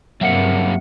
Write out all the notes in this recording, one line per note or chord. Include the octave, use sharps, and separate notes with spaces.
G2 C3 F#3 A#3 E5 F#5 C#7